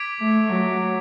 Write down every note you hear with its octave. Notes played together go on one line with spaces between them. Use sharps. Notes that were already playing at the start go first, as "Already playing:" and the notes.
Already playing: D6 G#6 B6 D7
A3
F#3